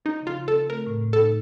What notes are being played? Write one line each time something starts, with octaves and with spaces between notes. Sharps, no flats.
F3 D#4
C#3 F4
C#3
A4
C4
A3 A#4
A2
A2
A4
D#4